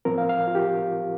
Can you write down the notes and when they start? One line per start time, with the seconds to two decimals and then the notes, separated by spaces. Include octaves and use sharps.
0.05 A2 F3 C4 A#4
0.18 F5
0.29 F5
0.47 F4
0.55 G4